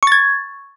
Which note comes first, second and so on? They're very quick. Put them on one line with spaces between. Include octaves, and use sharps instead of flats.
C#6 A6 G#6